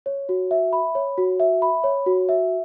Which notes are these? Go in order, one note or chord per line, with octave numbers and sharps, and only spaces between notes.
C#5
F#4
E5
B5
C#5
F#4
E5
B5
C#5
F#4
E5